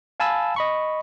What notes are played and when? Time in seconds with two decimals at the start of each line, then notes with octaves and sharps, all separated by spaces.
0.20 F5 G#5 A5 B5 E6
0.56 D#5 B5 C#6